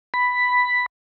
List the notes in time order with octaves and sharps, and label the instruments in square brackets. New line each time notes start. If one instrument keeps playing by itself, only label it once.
[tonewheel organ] B5